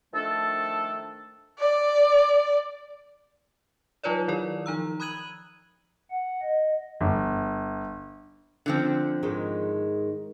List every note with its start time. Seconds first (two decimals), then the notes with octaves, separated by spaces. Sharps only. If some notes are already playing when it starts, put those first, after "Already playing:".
0.14 D#3 F3 A3 D4 A4
1.59 D5
4.03 F#3 D#4 F4 B4 C#5 D5
4.28 D#3 E4 A#4 D5
4.66 F3 D#4 A#5 E6
5.00 B5 D#6 F#6 G#6 D#7 F#7
6.10 F#5
6.42 D#5
7.01 G1
8.66 D3 F3 C4
9.23 G#2 D#3 G#3